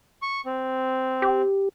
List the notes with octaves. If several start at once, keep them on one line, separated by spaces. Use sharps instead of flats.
C#6
C4
G4